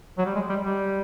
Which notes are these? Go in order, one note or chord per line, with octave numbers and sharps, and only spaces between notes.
F#3
G3
G#3
G3
G3